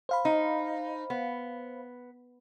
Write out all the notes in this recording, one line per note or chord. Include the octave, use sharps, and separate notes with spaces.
C5 F5 B5
D#4
B3